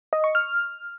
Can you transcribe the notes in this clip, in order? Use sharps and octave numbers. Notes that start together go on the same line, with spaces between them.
D#5
C#6
F6